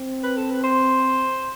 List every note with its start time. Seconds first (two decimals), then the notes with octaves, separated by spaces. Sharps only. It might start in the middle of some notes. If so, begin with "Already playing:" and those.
Already playing: C4
0.23 B4
0.37 A4
0.50 B4
0.64 C5